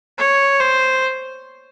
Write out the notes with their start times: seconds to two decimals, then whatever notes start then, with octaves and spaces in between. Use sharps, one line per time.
0.18 C#5
0.60 C5